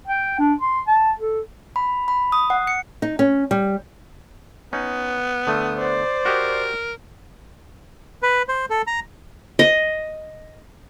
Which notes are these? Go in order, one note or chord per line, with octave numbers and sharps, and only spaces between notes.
G5
D4
C6
A5
A4
B5
B5
D#6
F#5
C#7
D#4
C#4
G3
B3 C#4 D#4
D3 A3 D#6
C5 D5
F#4 G4 A#4 D#5
B4
C5
A4
A#5
D#5